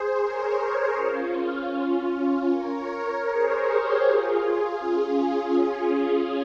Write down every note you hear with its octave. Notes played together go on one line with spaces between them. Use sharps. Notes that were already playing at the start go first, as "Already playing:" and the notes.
Already playing: G#4 C5
A#4 C#5
A#4 C#5
C#4 F4
A#4 C#5
G#4 C5
G4 A#4
F4 G#4
C#4